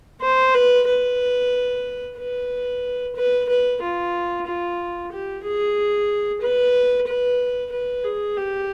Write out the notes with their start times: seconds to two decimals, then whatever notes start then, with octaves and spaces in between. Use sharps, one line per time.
0.21 C5
0.54 B4
0.87 B4
2.18 B4
3.15 B4
3.49 B4
3.81 F4
4.46 F4
5.12 G4
5.43 G#4
6.41 B4
7.07 B4
7.72 B4
8.04 G#4
8.37 G4